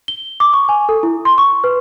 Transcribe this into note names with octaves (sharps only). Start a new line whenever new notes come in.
G7
D6
C#6
G#5
A4
E4
C6
C#6
B4